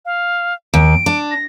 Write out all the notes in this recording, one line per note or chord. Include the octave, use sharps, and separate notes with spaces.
F5
D#2 D7
D4
A#6